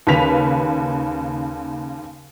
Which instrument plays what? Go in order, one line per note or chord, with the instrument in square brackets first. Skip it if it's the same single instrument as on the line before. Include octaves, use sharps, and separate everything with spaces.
[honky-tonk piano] D#2 C#3 B4 B6 F7